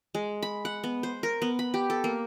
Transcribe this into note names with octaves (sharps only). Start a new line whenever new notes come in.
G#3
B5
F#5
B3
C5
A#4
B3
B5
G4
A4
A#3